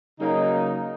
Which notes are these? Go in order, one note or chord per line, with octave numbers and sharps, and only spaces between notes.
C#3 F#3 A#3 D#4